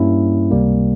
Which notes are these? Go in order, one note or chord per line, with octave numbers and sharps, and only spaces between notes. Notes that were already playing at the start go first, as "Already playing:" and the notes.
Already playing: G2 G3 A#3 C#4 E4
C#2 C3 G3 A#3